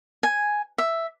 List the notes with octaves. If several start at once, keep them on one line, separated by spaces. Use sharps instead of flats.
G#5
E5